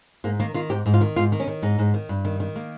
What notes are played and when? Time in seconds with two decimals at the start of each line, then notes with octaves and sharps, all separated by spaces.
0.24 G#2 A#3
0.40 D#3 A#3
0.54 D#3 F4
0.70 G#2 G4
0.86 G#2
0.94 F4
1.01 D#3
1.16 G#2 F4
1.32 D#3
1.40 C#4
1.48 D#3
1.62 G#2 D#4
1.79 G#2
1.94 D#3
2.09 G2
2.25 D#3
2.40 D#3
2.56 A#3